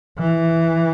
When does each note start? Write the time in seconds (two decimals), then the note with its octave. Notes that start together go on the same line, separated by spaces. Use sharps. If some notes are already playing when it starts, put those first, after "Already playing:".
0.19 E3